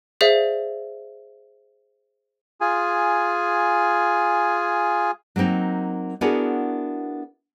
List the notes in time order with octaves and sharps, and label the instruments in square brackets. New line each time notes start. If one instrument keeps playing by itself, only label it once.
[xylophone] G#4 C5 D5 E5 F5
[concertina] F4 G#4 G#5
[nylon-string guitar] F#3 G3 A#3 C4 D#4
B3 D4 E4 F#4 G#4 A#4